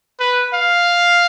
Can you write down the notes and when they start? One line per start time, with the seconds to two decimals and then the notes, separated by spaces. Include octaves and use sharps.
0.20 B4
0.53 F5